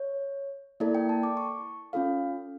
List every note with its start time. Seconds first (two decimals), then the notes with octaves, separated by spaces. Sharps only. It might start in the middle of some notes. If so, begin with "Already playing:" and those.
Already playing: C#5
0.80 A#3 E4 A4 D5
0.95 G5
1.09 A5
1.23 D6
1.37 C#6
1.93 C#4 F4 A4 F5